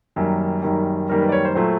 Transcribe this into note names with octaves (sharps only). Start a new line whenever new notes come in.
F#2 D#3 G3 A#3
F#2 D#3 G3 A#3
F#2 D#3 G3 A#3 A#4
B4
D5
C#5
C5
A#2 F#3 A3 C5